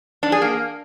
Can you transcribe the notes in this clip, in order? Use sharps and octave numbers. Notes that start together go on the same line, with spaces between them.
D4
G#4
A#3